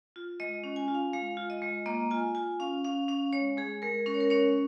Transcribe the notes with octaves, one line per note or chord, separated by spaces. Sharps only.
F4
G#3 D#5
C#4
G#5
F4
F5
G#3 F5
F4
D#5
G#3
A#3 D#5
F4 G#5
F4 G#5
C#4 F5
C#4 F5
C#4 F5
G#3 C#5
G#3 G#4
G#3 A#4
C#4 A#4
C#5
A#4
C#4 C#5